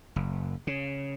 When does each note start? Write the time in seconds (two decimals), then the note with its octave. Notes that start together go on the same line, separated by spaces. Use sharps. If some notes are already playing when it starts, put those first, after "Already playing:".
0.16 F#1
0.67 C#3